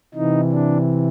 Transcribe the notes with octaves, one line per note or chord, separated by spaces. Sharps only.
C3 E3 D#4
D4